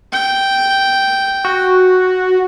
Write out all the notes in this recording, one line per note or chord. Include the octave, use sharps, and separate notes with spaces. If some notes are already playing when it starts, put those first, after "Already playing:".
G5
F#4